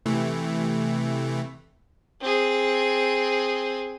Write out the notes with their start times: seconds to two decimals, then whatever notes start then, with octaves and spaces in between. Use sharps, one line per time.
0.06 C3 E3 A3
2.21 C4 G#4